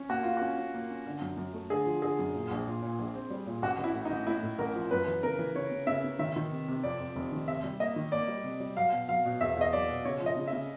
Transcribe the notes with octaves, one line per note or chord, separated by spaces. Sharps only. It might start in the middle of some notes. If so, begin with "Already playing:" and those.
Already playing: C#4
A#3 F#4
A#3 F4
C#4 F#4
C#4
A#3
C#4
D3
F#2
F#2
A3
D3 G#4
F3
D3 G#4
F#2
A#2
A#1
A#2
A#2
A#1
C4
G3
A#2
A1 F#4
A1
E4
A2
D#4
A1
A2 E4
A2
A1 A#4
F3
F#2 B4
E3
C#3 A#4
E3
C#3 C#5
C#3
C#3 E5
C#3
D#3 E5
D#3
C3
C3
F2 D5
F2
F1
D#3
C3 E5
G3
A#3 D#5
D#3
A#3 D5
G3
C3
G3
F#3 F5
B2
F#3 F5
B2
E2 E5
E2 D#5
F#3 D5
B2
C#3 C#5
F3
D#5
C#3
E5
C#3